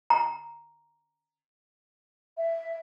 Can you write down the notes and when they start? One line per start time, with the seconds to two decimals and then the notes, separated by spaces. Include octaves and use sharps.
0.10 A#5
2.37 E5